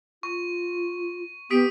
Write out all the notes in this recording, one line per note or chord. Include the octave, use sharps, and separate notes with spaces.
F4 C#6
B3 G4 D#6 B6 D7